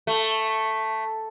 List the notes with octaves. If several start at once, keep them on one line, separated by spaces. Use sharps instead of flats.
A3